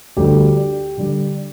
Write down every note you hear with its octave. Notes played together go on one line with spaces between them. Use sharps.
D2 D3 G3 G4
D3 G3